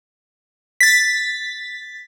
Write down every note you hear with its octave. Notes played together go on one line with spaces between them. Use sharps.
A6 B6